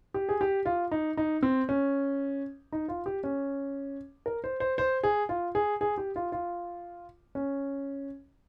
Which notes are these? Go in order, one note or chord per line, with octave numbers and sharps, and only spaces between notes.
G4
G#4
G4
F4
D#4
D#4
C4
C#4
D#4
F4
G4
C#4
A#4
C5
C5
C5
G#4
F4
G#4
G#4
G4
F4
F4
C#4